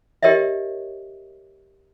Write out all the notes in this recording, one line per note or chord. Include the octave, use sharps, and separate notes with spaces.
G4 A#4 C#5 D#5 E5